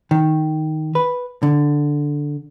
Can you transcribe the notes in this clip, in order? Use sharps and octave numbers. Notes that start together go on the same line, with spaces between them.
D#3
B4
D3